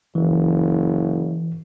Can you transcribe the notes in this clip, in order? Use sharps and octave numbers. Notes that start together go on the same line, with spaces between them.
F#1 E3